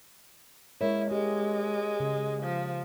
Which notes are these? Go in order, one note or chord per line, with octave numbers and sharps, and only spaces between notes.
G#3 E4 A#4 C#5
G#3 G4
C#3
F3